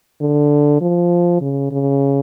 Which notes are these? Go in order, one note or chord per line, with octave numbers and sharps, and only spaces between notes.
D3
F3
C#3
C#3